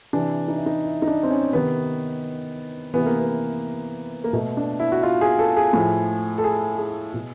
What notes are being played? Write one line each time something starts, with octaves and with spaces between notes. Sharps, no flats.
C3 E3 D4
D#4
E4
D#4
E4
D#4
D4
C4
C#4
C3 D#3 B3
C3 E3 B3
A#3
B3
A#3
B2 A3
D4
E4
F#4
F4
G#4
A4
G#4
A2 F3
A4
G#4
G#4
B2